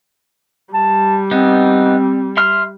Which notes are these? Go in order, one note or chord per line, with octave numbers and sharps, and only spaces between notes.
G3 A5
B3 C4 D#4
E5 C6 F6